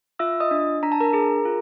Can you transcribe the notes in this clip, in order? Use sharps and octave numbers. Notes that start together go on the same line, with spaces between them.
F4 E5 E6
D#5 D#6
D4
D4 A#5
A5
A#4 A#5
G#4
F4